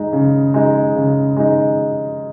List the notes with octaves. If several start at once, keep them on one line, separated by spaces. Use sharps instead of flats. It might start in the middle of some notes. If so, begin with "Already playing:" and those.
Already playing: G#3 D#4
C#3
G#3 D#4
C#3
G#3 D#4